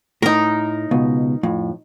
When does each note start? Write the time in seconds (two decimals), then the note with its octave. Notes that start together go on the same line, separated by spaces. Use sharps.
0.22 A2 D#4 A#4
0.91 C#2 B2
1.43 F2 A2